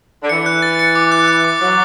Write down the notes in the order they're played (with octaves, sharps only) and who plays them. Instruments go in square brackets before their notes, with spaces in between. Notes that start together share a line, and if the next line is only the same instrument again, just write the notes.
[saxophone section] D3
[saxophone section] E3 [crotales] C#7
[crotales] F#6
A6
C#7
D6
F#6
F#6
D6
[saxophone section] F#3 [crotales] D6